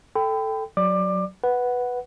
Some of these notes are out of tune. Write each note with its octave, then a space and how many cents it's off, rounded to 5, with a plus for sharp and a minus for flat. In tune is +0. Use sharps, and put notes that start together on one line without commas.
A4 +0 G5 +0 B5 +40
F#3 +0 D5 +10 D6 +20
B4 +0 F#5 +0